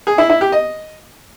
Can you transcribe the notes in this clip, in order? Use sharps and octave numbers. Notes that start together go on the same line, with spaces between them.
G#4
E4
E4
G4
D#5